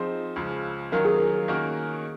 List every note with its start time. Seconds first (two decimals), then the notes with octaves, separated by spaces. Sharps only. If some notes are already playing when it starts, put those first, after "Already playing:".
Already playing: F3 C4 D#4 G#4
0.36 C#2 C#3 F3
0.92 D#3 F#3 C#4 F4 A#4
1.05 G#4
1.16 A#4
1.48 D#3 A#3 C#4 F#4 A#4